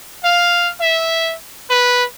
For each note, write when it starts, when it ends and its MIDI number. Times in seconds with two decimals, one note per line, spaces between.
0.24 0.70 77
0.80 1.35 76
1.69 2.04 71